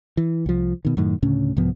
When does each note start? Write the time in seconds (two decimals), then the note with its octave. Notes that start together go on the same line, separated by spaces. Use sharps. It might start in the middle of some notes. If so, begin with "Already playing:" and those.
0.17 E3
0.46 C2 F3
0.85 B2 D#3
0.97 F#2 A2 D#3
1.23 D2 A2 C#3 C#4
1.57 C2 G#2 F3 B3